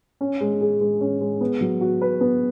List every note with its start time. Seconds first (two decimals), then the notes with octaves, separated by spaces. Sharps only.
0.21 C#4
0.41 G#3
0.61 G#4
0.81 G#3
1.01 C#4
1.21 G#3
1.41 B3
1.61 F#3
1.81 F#4
2.01 B4
2.21 B3